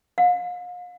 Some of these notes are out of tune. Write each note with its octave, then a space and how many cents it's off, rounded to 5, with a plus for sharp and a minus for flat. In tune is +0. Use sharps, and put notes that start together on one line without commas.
F5 +40